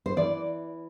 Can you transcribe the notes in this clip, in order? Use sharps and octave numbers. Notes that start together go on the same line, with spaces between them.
C5
E3 D5